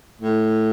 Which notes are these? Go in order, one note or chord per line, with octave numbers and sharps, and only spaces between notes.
A2